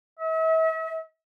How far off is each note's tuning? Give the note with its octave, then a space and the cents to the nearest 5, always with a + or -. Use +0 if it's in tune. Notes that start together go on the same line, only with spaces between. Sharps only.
E5 -40